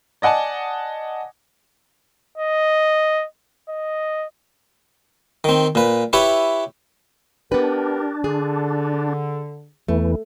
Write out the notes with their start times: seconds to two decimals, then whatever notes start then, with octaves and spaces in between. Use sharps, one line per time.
0.22 D5 D#5 F#5 G#5 A5
2.38 D#5
3.69 D#5
5.44 D#3 C4
5.75 A#2 B4
6.13 E4 G4 B4 C#5 E5
7.52 B3 D4 G4 A#4 B4
8.24 D3 G#4
9.88 E2 E3 A3